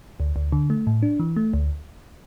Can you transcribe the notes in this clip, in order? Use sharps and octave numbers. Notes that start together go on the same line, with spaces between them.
D2
D2
D3
A3
A2
D4
E3
A3
D2